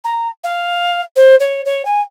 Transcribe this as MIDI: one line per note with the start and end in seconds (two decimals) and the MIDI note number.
0.04 0.28 82
0.44 1.01 77
1.16 1.36 72
1.40 1.62 73
1.65 1.85 73
1.85 2.01 80